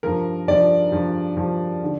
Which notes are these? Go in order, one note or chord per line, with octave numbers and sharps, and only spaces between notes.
G2 F3 A#4
G2 F3 D5
G2 F3
G2 F3
D3